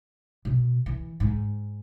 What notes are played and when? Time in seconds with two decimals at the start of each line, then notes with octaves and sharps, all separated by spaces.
0.45 B2
0.86 E3
1.20 G#2